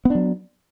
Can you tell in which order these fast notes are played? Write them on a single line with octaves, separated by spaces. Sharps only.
B3 D4 F#3